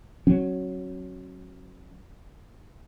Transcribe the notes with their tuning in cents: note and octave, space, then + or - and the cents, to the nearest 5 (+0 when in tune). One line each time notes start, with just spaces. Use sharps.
F#3 +0 C#4 -35